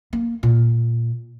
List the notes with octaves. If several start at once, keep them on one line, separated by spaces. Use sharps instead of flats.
A#3
A#2